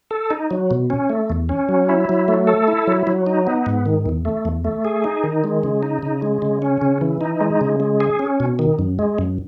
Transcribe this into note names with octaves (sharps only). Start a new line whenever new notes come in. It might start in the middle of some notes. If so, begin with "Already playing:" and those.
A4
D#4
F#3
B2
C#4
A3
E2
C#4
F#3
E4
F#3
A3
A4
E4
F#3
F#3
D#4
B3
G#2
D#3
E2
A3
E2
A3
G#4
D#4
D#3
G#3
C#3
D#4
C#3
G#3
C#3
C#4
C#3
E3
D#4
G#3
C#3
G#3
G#4
C#4
B2
D#3
F#2
G#3
F#2